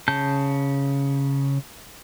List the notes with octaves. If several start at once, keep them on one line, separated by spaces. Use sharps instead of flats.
C#3 A5 G6